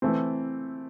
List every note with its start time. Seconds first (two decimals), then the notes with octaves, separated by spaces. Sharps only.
0.02 E3 A3 C4